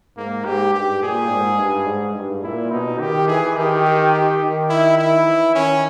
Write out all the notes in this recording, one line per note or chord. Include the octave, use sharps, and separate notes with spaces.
G#2 A#3
G#2 G4
G2 G4
A#2 G#4
G#2
G2
G#2
G2
A#2 E4
B2 D#4
D#3 G4
E3 G#4
D#3 G4
G4
G4
D#3
E4
E4
E3
D#3 C#4